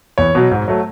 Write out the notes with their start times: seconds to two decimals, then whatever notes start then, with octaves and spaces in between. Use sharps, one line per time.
0.18 E2 C#5
0.35 B2 F#3
0.51 G#2
0.68 F#3 A3